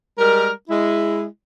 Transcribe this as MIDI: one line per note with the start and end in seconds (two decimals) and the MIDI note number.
0.18 0.50 55
0.18 0.50 56
0.18 0.50 70
0.69 1.25 56
0.69 1.25 64